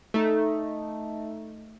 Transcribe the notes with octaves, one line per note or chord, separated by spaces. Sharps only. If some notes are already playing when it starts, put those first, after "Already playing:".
A3 D#4